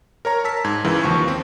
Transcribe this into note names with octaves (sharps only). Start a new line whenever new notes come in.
A#4 C#5 A#5
A5 E6 B6
G#2 G#6
C#2 C#3 E3
D#2 F3 C#6
C4